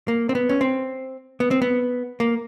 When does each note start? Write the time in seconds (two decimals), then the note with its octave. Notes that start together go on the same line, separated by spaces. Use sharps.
0.08 A#3
0.29 C4
0.35 B3
0.49 C#4
0.61 C4
1.40 B3
1.51 C4
1.62 B3
2.20 A#3